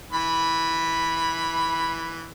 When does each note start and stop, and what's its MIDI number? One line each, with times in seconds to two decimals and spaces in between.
0.13 2.28 52
0.13 2.28 83